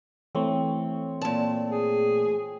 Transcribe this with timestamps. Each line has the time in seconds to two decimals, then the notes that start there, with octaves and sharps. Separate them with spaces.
0.35 E3 A3 C4 C#5
1.21 A#2 A5
1.71 G#4